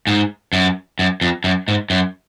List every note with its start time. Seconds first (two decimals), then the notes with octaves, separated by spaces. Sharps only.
0.07 G#2
0.53 F#2
0.99 F#2
1.21 F2
1.44 F#2
1.68 G#2
1.90 F#2